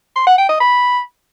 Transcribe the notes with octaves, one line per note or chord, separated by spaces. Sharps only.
C6
F#5
G5
D#5
B5